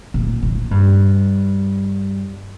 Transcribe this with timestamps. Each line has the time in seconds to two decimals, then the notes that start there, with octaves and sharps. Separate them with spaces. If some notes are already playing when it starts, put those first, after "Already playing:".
0.14 A#2
0.43 A#2
0.71 G2